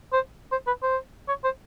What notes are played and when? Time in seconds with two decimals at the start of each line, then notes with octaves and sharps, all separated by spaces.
0.12 C5
0.52 C5
0.67 B4
0.83 C5
1.28 C#5
1.44 C5